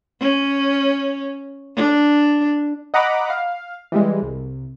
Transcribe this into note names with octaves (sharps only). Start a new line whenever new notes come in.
C#4
D4
D#5 F#5 A#5 B5 D6
F5
E3 G3 G#3
C2